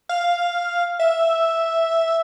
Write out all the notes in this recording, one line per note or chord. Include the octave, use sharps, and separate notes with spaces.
F5
E5